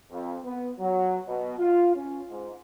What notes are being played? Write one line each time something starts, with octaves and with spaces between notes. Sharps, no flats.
F2
B3
F#3
B2
F4
C#4
G#2